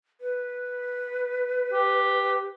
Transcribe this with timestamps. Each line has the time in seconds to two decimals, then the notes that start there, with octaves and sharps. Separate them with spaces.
0.21 B4
1.72 G4